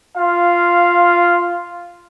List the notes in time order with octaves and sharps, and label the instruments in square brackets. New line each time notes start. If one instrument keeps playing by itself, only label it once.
[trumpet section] F4 F5